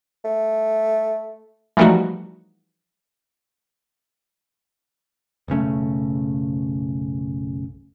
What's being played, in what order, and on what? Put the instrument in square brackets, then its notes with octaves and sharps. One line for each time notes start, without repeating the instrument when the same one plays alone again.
[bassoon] A3
[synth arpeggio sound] E3 F3 G3 A3 D#4 F#4
[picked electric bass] F#1 B1 C#3 A3